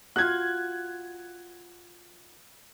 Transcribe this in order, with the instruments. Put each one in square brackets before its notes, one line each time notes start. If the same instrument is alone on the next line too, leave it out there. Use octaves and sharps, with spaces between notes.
[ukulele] F4 F#4 [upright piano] F#6 G#6